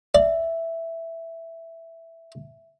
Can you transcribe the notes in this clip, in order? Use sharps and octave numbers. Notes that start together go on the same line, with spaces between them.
D5 E5